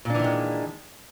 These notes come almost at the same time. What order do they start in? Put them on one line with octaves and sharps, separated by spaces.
A#2 D4 E3 D#3 G#3